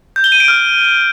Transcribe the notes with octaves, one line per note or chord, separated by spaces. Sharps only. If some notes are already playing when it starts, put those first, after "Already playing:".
G6
G7
D#7
D7
F6